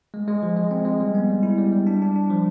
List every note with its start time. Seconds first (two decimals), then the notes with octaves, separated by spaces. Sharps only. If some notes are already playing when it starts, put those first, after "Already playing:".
0.14 G#3
0.28 G#3
0.43 F3
0.57 G#3
0.71 C4
0.85 G#3
1.00 G3
1.15 B3
1.29 G3
1.43 E4
1.58 G3
1.72 G3
1.87 D4
2.02 D4
2.16 D4
2.30 F3